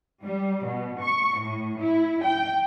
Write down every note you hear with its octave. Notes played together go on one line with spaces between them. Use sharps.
G3
B2
C#6
A2
E4
G5